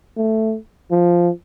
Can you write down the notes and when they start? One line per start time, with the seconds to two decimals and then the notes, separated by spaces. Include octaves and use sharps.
0.17 A3
0.91 F3